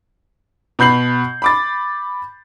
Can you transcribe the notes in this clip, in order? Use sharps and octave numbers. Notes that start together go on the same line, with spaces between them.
B2 B5 G6 C7 F#7
B5 D6 A6